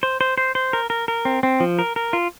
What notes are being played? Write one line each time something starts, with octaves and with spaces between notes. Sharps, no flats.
C5
C5
C5
C5
A#4
A#4
A#4
C4
C4
F3
A#4
A#4
F4